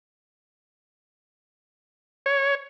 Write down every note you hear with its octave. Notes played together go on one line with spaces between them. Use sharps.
C#5